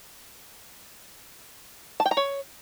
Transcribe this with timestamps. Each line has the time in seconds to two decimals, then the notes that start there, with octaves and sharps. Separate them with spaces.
2.00 A5
2.06 G5
2.11 A#5
2.17 C#5